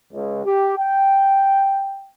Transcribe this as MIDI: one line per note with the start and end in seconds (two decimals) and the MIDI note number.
0.13 0.42 37
0.45 0.76 67
0.79 2.11 79